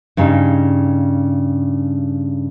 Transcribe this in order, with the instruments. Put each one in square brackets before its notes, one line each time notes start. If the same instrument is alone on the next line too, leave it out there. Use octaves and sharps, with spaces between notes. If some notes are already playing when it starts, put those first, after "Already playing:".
[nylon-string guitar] G2 C#3 D#4